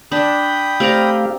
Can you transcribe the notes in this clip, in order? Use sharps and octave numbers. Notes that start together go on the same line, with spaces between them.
D4 G5 B5 D#6
A3 C4 G4 D5 F5 A#5